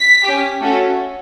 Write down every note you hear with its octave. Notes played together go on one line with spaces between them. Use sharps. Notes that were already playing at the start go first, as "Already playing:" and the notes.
Already playing: B6
C#4 G4
A3 C#4 F#4 A4